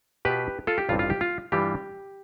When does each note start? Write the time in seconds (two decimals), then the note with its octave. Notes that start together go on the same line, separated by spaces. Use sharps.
0.25 B2 B3 F4 G4 B4
0.67 F4 A4
0.78 G4
0.89 A1 G2 E3 G3 C4 F4
0.99 F4
1.10 G4
1.21 F4
1.52 G2 E3 G3 D4 F4 G4